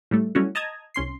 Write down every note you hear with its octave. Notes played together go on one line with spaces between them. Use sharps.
A2 G3 A3
F#3 G3 A3 C#4 E4 F#4
D#5 A5 A#5 D#6 G#6
C2 C#4 C6 C7